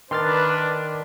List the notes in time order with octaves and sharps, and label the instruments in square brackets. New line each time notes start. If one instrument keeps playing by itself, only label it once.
[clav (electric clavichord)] D#3 D5 [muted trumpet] D4 [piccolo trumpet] B4 [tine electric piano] C6 F6 A6